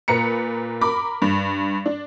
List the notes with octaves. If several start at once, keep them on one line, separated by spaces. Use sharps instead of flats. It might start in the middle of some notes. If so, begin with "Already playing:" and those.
A#2 B4 A#5 C#7
A#4 B5 D6
G2
D4